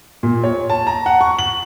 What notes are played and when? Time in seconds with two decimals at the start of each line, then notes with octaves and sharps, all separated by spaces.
0.23 A#2
0.44 C#5
0.70 A5
0.87 A#5
1.06 F#5
1.21 C#6
1.39 F#7